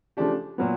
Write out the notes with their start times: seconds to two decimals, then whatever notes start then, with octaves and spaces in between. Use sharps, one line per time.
0.17 C#3 F3 A3 D4 G4
0.58 A#2 F#3 B3